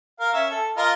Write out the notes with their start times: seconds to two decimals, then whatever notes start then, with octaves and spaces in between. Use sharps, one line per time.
0.20 A#4 F5
0.34 C#4 E5
0.51 A4
0.77 F4 A#4 D#5